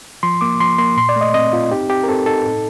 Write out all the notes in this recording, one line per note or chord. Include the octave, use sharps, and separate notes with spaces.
F3 C6
A#3 D6
F3 C6
A#3 C6
A#2 C6
D5
A3
D#5
C4 D#5
C4 F4
D#4 G4
C4 G4
A#4
C4 A4
D#4 A4
A2